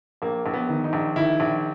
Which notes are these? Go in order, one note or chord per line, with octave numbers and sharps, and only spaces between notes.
A#1 A#3
A#1
B3
D#3
D#4
A#1
D#3 E4
A#1